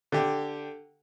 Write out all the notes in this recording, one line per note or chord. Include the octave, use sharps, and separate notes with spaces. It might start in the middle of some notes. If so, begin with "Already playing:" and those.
D3 G4